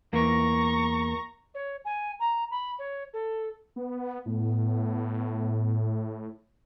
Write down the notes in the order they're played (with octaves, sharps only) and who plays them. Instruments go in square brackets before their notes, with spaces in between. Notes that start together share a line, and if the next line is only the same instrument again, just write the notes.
[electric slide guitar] E2 A#3 [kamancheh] A#5 C#6
[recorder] C#5
G#5
A#5
B5
C#5
A4
[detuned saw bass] B3
[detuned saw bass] A2 [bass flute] B3